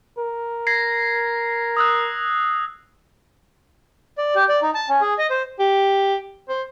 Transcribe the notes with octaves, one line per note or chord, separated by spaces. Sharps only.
A#4
G#6 A#6 C7
D#6 E6 F#6
D5
G4
D5
D#4
A5
C#4
G#4
D#5
C5
G4
C5